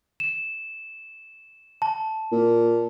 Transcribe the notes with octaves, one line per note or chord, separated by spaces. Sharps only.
E7
A5
A#2